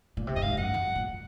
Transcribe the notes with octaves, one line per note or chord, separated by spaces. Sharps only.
A#2
C3
F#2 D#5
G#2 F5
F#2 F#5
F2
A#2